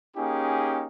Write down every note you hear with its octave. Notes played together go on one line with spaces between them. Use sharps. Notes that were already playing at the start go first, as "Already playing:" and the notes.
A#3 C#4 D#4 G4 G#4